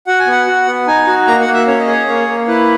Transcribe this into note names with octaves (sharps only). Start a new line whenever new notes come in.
F#4 F#5
G#5
B3 F#5
F#4
B3
D#4 G#5
F#4
A#3 A#5
F#5
A#3
E5
C#4 C#5
D#5
G#4 C#5
A#3 C#5
A#3
E4 B4